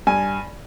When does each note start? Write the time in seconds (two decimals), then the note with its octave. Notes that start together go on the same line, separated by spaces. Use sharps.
0.07 G2 G#5